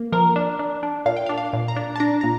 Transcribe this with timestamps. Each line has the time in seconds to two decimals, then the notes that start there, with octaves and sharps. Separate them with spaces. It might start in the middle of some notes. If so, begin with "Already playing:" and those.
Already playing: A#3
0.12 F3 A#4
0.36 D4
0.59 D4
0.83 D4
1.05 A#2 F5
1.17 G5
1.26 F5
1.29 D4
1.38 F5
1.53 A#2
1.68 A#5
1.76 D4
1.96 A5
2.00 D4 A#5
2.21 A#2 A#5